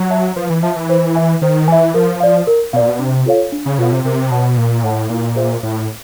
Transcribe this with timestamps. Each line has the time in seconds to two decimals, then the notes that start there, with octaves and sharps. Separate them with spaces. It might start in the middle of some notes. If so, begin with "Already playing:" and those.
Already playing: F#3
0.10 E5 A5
0.36 F3 B4
0.50 E3
0.63 F3 E5 A5
0.76 E3
0.89 C5
1.15 E5 G#5
1.41 D#3 C5
1.68 E3 E5 G#5
1.94 F3 A#4
2.20 D5 F5
2.47 A#4
2.73 B2 F5
2.76 A#2 D5
2.88 B2
2.99 C3 D4
3.26 F4 A4 C#5 F5
3.52 D4
3.66 C#3
3.78 B2 F4 A4 C#5 F5
3.92 C3
4.04 C3 A#4
4.31 B2 C#5 F#5 A5
4.57 A#2 A#4
4.83 A2 C#5 F#5 A5
5.09 A#2 E4
5.36 G#4 C5 E5
5.63 A2 E4